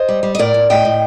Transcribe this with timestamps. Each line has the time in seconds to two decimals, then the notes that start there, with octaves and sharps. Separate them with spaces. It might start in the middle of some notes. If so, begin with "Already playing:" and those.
Already playing: C5 D#5
0.09 G3
0.23 G3
0.35 D#5
0.39 A2 A#4 D5
0.54 A2
0.70 A2 D#5 G5
0.85 A2